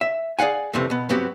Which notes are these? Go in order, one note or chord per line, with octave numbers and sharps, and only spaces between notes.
E5
G#4 D5 F5 F#5 G#5
C2 F2 C3 E3 A3 C4
B2 B3
G2 F#3 B3 C4 F#4 G4